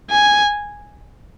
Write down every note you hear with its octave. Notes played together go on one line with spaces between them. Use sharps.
G#5